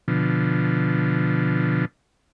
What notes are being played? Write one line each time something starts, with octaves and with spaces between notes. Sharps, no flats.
B2 D3 F3